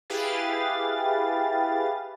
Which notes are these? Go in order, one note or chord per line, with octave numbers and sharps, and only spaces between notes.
E4 G4 G#4 B4 F5 A6